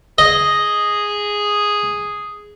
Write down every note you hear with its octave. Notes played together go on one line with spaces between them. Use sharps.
G#4 D#5